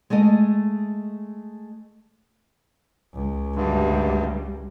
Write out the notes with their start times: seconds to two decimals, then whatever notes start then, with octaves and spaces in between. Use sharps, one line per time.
0.10 G#3 A3 A4 D#5
3.14 C#2
3.56 D2 G2 G3